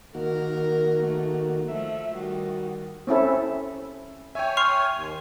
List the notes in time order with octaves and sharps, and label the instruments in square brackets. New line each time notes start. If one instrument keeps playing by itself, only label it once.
[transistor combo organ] D#3 A#3 F#4 [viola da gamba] A#4
[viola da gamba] A3
[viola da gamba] F3 A3 [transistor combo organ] E5
[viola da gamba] D#3 G3 [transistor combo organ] F#4
[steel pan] C4 C#4 E4 A4
[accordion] C#5 G#5 [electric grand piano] E5 G5
[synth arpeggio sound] C6 F6 [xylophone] C#6
[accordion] D#2